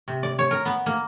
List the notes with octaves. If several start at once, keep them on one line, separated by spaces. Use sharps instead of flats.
C3
D5
C#5
A#4
B3
A#3